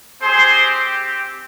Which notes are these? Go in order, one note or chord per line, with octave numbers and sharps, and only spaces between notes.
C4 G4 G#4 C5